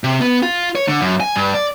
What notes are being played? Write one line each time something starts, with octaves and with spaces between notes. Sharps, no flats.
C3
B3
F4
C#5
D3
F#2
G#5
G2
D5